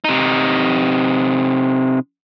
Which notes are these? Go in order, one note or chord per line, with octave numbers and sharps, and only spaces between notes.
C3 D#4